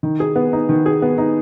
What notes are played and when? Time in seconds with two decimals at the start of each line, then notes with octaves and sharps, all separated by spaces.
0.03 D#3
0.20 G#4
0.36 B3
0.53 D#4
0.69 D#3
0.86 G#4
1.02 B3
1.18 D#4